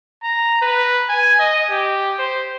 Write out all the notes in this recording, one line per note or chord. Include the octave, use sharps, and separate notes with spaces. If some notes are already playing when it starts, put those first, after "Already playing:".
A#5
B4
G#5
D#5
G4
C5